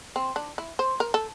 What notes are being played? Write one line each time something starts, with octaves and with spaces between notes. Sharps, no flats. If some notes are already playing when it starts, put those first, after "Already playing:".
C4
D4
E4
C5
A#4
A4